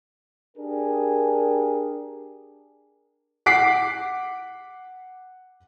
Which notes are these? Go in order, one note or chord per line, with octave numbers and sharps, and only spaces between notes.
D4 G4 G#4 A#4
F#5 D6 B6 C7